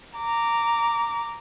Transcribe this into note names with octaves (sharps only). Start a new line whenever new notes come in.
A#5 D6